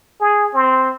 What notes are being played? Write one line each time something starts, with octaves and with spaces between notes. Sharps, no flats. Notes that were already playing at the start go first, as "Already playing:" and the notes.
G#4
C4